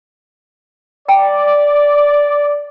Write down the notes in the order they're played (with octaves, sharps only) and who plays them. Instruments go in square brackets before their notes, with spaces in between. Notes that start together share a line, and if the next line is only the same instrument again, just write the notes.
[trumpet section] D5 [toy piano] G5 A#5